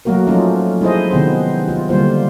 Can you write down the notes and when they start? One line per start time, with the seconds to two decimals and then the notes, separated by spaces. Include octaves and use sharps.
0.05 F#3 A3 A#3 F#4 A#4
0.27 F3 F#3 A3 C#4 D#4 F4
0.81 G#3 D#4 E4 G#4 C5 D#5
1.11 C3 D#3 B3 C4 C5
1.68 F4
1.89 D3 G3 A#3 F4 C5